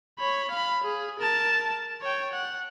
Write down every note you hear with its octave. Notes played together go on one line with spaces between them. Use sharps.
C#5 B5
F5 B5
G#4
A#4 A5
C#5 G5
F#5